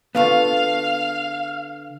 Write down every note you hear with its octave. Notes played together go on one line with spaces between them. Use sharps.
D3 B3 F4 A4 F5 C#6